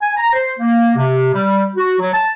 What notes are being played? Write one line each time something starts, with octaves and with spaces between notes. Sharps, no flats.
G#5
A#5
C5
A#3
C3
G3
F#4
F#3
A5